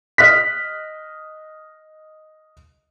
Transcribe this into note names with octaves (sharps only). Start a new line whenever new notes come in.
D#5 D#6 F6 F#6 B6